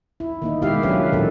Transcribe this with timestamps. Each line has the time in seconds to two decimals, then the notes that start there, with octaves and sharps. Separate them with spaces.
0.20 E4
0.42 D#3 A#3 D#4
0.62 B2 G#3 E4 G4 E5 F5
0.83 D#3 F#3 C#4 D4 B4 F5
1.13 A#2 E3 F3 A#3 A4